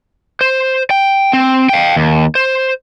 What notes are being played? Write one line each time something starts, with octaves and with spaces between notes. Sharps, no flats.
C5
G5
C4
F5 G5
D#2
C5